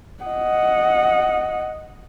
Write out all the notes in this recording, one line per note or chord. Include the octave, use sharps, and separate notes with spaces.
D#5 F#5